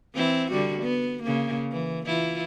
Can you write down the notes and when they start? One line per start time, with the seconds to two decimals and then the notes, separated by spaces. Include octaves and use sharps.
0.15 E3 C4 E4
0.51 D3 G3 F#4
0.83 B3
1.23 C#3 A#3
1.71 E3
2.06 E3 E4 F4